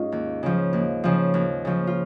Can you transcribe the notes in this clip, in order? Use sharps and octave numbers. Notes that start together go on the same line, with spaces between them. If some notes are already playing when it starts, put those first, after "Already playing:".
Already playing: G#2 C#4 D#4 F4
D#2
C#3 F3
D#2
C#3 F3
D#2
C#3 F3
F4